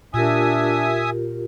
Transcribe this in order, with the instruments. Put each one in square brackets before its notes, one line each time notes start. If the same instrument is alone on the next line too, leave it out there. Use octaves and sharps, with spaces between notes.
[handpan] A#2 [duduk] D4 [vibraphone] F4 G4 A#4 [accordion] E5 G#5 D#6